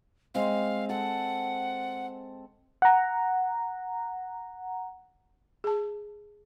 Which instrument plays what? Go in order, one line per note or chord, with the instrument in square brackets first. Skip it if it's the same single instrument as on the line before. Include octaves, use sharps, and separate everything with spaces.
[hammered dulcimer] G#3 C4 [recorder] F5
[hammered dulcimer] A4 [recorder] F#5
[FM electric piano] F#5 A#5
[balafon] G#4 A5